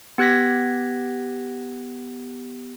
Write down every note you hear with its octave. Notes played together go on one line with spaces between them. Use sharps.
B3 G4 F#6 G#6 A#6 B6